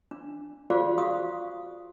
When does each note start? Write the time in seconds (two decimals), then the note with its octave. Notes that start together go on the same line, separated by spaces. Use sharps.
0.11 D4
0.70 F4 F#4 G#4 C5 D5 F5
0.98 F#4 F5 C#6 D#6